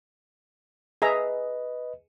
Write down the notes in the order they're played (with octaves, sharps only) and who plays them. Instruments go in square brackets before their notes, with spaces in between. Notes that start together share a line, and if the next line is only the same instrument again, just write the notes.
[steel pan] G#4 E5 A#5 [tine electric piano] B4 D#5